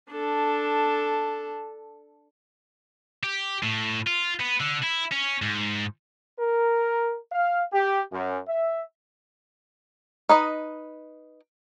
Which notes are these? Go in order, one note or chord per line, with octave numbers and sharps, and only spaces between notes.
D4 A4
G4
A2
F4
B3
D3
E4
C#4
G#2
A#4
F5
G4
F#2
E5
D#4 B4 D#5